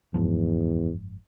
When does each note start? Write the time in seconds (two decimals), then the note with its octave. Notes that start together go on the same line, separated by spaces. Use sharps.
0.14 F#1 E2 G#2 F3